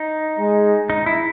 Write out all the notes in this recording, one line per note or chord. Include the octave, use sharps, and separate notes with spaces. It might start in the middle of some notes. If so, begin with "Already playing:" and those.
Already playing: D#4
G#3
D#4
E4